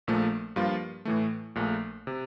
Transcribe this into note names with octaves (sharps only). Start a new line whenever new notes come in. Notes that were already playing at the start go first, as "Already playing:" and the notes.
A#1 A#2 F3 A3
G2 F3 A#3 F4
A2 E3 A3
A#1 A#2 A3
C3